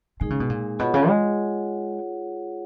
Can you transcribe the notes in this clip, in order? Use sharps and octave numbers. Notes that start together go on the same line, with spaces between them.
D#3 G#3 D#4 G#4
C#3
B2
A#2
B2 F4 G#4 C#5 F#5
C#3
G#3